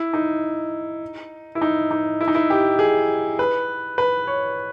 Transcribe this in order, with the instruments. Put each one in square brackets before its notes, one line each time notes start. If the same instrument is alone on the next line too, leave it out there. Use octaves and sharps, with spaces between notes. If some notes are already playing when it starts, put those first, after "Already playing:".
Already playing: [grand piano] E4
D#4
E4
D#4
D#4
E4
D#4
E4
G4
G#4
B4
B4
C#5